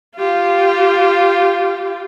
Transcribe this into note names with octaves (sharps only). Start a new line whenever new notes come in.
F4 G4